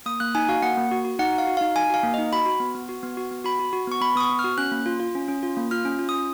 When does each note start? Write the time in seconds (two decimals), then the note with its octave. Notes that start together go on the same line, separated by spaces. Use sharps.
0.06 A#3 D#6
0.20 A#3 F#6
0.35 D#4 G#5
0.49 F#4 F5
0.62 A#3 F#5
0.77 A#3
0.91 F#4
1.05 F#4
1.19 D#4 F#5
1.33 F#4
1.38 F5
1.47 F#4
1.57 F5
1.61 D#4
1.76 D#4 G#5
1.90 F#4 F5
2.03 A#3
2.14 D#5
2.18 D#4
2.33 F#4 B5
2.46 F#4
2.60 B3
2.75 B3
2.89 F#4
3.03 B3
3.17 F#4
3.31 B3
3.44 F#4 B5
3.59 F#4
3.73 F#4
3.87 B3 C#6
4.01 B3 B5
4.15 B3 D#6
4.20 C#6
4.29 B3
4.39 F6
4.44 F#4
4.58 C#4 F#6
4.72 A#3
4.86 F4
5.00 F4
5.15 C#4
5.28 C#4
5.43 F4
5.57 A#3
5.71 F4 F6
5.85 C#4
5.99 F4
6.09 D#6
6.14 C#4